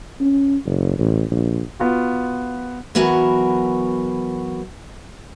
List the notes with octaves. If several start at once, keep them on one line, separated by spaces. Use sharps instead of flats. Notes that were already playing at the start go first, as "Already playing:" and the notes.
C#4
F#1
A1
A#1
B3 F4 F#4
E3 F#3 B3 F#4 A#4 G#5